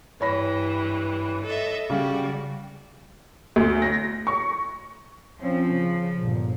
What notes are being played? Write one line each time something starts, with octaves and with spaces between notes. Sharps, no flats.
G2 E3 C#5 B5 A#6
A4 D#5 E5
C#3 G3 F#4
D2
A#6
C#6
F3 C4 C#4
C#3
G1 A#2